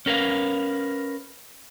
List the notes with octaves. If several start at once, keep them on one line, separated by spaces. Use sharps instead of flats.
C#4 A#4 B4 F5